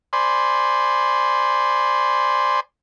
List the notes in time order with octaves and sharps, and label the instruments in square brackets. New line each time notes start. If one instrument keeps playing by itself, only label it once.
[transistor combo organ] C5 D5 G#5 B5 C6